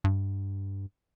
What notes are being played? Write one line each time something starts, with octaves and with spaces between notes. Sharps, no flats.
G2